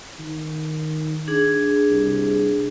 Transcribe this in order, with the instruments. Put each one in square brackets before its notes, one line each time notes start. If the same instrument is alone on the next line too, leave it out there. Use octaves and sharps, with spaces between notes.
[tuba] D#3
[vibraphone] D4 G#4
[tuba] C2